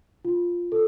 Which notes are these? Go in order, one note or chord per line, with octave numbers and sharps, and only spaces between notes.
F4
A4